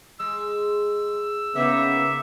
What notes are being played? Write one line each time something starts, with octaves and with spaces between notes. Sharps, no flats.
G#3 E6
C#3 A#3 B3 D#4 E5